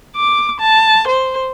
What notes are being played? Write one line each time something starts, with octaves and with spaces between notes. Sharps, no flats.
D6
A5
C5